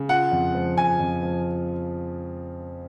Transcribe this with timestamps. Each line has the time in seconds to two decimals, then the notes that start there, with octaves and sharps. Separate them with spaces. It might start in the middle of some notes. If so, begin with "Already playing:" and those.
Already playing: C#3
0.09 F4 F#5
0.32 F2
0.54 F3
0.77 F2 G#5
0.99 F2
1.22 F3